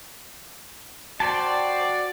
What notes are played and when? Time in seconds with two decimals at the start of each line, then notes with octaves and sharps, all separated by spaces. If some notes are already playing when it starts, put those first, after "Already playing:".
1.20 F#4 C5 D5 G5 A5